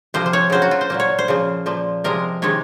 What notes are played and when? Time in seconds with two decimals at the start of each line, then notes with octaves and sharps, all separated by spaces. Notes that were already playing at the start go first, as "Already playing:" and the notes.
0.14 C3 F3 A#3 C5
0.26 C5
0.33 C#5
0.50 C#3 F#3 A#3 C5
0.62 F#4
0.71 F4
0.81 C5
0.90 A#2 F#3 A#3
1.00 C#5
1.19 C5
1.28 C#3 F3 A#3
1.66 A#2 F3 A#3
2.04 C3 F3 G#3 A#4
2.42 C3 D#3 G#3 C#5